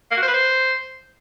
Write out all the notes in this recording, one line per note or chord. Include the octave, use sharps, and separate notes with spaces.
A#3
F#4
C5
B4
C5